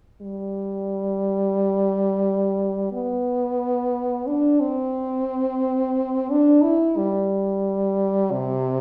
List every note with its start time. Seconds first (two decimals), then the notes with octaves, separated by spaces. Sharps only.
0.21 G3
2.92 B3
4.27 D4
4.60 C4
6.30 D4
6.63 E4
6.97 G3
8.32 C3